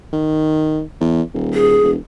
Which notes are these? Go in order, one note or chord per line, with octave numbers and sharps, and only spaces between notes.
D#3
E2
D#1
G#4
E1